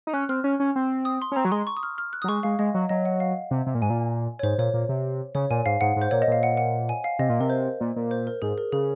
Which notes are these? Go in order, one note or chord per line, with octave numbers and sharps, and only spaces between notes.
D#4
C#4 F#6
C4 F6
C#4
C#4
C4
D#6
C6
C#4
C4 A#5
F#3
G#3 C6
C#6
D#6
F6
F6
F#6
F#3 D#6
G#3 C#6
G#3 F5
G#3 D#5
F#3
F#3 D#5
F#5
F5
C3
C3
A#2
G#2 G#5
A#2
C#5
G#2 C5
A#2 C#5
A#2
C3
C#3 C#5
A#2 G#5
G#2 F5
G#2 F#5
G#2
C5
A#2 C#5
D#5
A#2 F5
F#5
F#5
G#5
F5
C3 D#5
A#2
C3 A#4
C5
A#2
A#2
C5
A#4
G#2 G#4
A#4
C#3 G#4